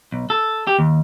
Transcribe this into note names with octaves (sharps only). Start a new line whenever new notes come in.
B1
A4
G4
D#2